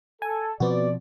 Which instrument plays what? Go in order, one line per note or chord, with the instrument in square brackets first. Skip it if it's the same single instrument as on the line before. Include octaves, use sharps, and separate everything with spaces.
[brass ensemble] A4 [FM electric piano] G#5
[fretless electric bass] B2 F3 C4 [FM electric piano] B3 F#4 [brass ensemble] D5